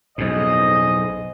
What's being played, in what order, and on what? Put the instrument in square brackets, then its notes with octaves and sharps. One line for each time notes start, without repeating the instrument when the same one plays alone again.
[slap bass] B1 F2 A2 [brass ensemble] G#4 C5 D#5